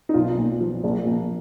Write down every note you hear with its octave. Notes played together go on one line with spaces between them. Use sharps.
D#4
B1 F4
A#2
F3
A#1
A#2